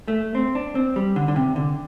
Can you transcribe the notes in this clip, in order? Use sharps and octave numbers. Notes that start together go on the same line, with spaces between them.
A3
C4
D4
C4
G3
D3
D3
C3
D3